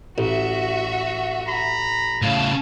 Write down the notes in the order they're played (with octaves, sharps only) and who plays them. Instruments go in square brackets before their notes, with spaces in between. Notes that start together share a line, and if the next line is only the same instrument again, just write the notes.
[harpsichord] A1 [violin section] F#4 E5
[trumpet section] A#5 B5
[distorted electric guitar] A2 C#3 [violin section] F5 A5